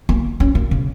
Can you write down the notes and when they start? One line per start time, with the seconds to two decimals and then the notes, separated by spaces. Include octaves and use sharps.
0.09 A#3
0.40 C#4
0.55 A#3
0.71 C#3